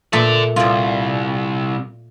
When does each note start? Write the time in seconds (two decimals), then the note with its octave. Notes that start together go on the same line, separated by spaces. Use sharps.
0.13 A#2 A3 A4 D5
0.56 C2 F4 D5